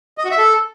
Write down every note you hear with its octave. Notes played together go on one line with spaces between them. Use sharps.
D#5
F#4
E5
A4